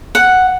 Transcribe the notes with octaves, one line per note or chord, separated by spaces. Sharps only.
F#5